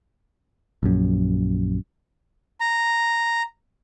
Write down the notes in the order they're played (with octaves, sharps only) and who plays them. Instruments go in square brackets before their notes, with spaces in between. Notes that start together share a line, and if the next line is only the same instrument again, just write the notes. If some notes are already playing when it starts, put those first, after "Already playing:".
[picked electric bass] A#1 F#2
[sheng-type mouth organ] A#5